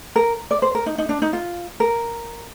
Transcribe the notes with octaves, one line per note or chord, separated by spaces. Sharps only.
A#4
D5
C5
A#4
D#4
D#4
D4
D#4
F4
A#4